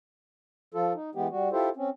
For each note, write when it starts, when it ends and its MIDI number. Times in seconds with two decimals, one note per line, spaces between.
0.74 0.93 53
0.74 0.93 65
0.74 0.93 69
0.94 1.10 63
1.15 1.28 52
1.15 1.28 56
1.15 1.28 59
1.15 1.28 67
1.31 1.49 55
1.31 1.49 66
1.52 1.69 64
1.52 1.69 65
1.52 1.69 67
1.52 1.69 69
1.52 1.69 72
1.76 1.90 60
1.76 1.90 61